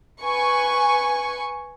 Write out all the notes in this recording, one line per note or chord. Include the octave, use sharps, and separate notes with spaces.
B4 G#5 C#6